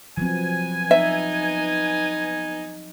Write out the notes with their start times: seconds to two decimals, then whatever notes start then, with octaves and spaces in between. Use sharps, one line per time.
0.17 F3 F#3 B3 C4 G#5
0.91 D#4 E5